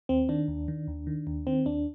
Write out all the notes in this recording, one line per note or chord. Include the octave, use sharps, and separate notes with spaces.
D#2 C4
D#3 D4
D#2
D#3
D#2
D#3
D#2
D#3 C4
D#2 D4